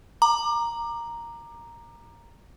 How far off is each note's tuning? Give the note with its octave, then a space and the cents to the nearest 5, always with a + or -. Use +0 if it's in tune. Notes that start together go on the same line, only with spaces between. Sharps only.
A#5 +0 D6 +25